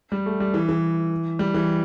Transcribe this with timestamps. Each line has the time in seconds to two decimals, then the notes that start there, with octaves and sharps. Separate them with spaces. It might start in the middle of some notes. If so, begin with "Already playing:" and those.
0.12 G3
0.26 A3
0.40 G3
0.54 E3
0.69 E3
1.39 G3
1.54 E3